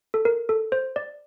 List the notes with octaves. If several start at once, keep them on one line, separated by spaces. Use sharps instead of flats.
A4
A#4
A4
C5
D5